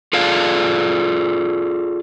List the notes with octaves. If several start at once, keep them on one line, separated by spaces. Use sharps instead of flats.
F4 G#4 A4 D5 F5